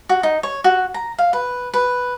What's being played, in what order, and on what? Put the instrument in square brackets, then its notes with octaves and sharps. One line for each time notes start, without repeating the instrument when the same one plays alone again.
[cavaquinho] F#4
D#4
C#5
F#4
A#5
F5
B4
B4